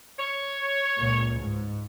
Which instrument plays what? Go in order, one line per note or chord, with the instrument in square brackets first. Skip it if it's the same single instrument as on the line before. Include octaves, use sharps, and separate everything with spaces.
[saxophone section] C#5
[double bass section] C#2 A#2
G#2